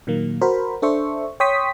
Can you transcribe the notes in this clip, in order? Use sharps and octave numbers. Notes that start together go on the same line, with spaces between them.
A#2 D#3 F#3 A#3
F#4 A#4 C5 B5
D4 A4 C5 E5 C#6
C#5 G5 C6 C#6 D#6 B6